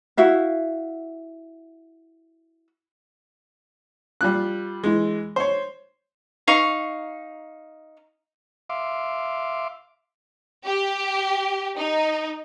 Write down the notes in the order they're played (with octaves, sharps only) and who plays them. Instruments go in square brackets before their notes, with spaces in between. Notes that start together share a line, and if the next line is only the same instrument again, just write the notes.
[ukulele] E4 F#4 E5 F5
[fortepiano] G3 F4 F#6
E3 G#3
C5 C#5
[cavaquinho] D#4 F5 C#6
[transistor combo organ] E5 F5 C6 D6
[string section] G4
D#4